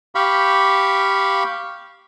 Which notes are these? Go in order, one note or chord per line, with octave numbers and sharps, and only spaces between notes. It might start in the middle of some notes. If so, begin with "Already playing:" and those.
G4 F5 B5 C#6